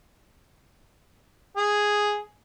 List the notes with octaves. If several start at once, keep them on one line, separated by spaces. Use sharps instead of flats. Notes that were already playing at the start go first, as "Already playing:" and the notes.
G#4